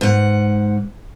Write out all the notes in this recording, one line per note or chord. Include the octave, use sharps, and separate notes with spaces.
G#2 F#5